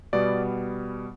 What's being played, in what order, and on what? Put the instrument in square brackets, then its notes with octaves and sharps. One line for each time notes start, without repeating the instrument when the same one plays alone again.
[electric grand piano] B2 G3 B3 D5